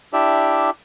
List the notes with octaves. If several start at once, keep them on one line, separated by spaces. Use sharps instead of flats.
D4 E4 G4 D5 E5